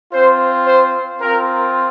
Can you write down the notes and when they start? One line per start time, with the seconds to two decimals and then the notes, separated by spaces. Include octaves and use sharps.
0.14 C4 F4 C5
0.66 C5
1.20 C4 F4 A#4